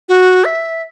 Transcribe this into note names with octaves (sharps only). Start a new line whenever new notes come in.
F#4
E5